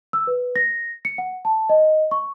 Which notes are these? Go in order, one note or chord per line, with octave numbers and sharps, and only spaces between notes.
E6
B4
A#6
C#7
F#5
A5
D#5
C#6